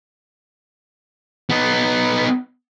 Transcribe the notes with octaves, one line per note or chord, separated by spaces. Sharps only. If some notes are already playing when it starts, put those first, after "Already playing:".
B3 D#4